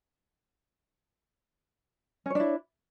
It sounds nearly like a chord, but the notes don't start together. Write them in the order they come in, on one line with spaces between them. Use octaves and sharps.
C#4 C#5 D4 E4